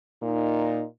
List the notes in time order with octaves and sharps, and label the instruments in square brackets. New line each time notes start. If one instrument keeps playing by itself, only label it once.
[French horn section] A#2 D#4